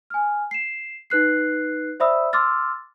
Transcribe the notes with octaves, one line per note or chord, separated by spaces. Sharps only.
G#5 F6
C7 E7
D#4 B4 F#6 C7
C5 D5 E5 B5 D#6 E6
C6 D6 E6 F6 A6